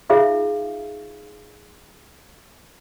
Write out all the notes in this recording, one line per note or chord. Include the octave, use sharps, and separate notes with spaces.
D#4 F4 G#4 E5 F5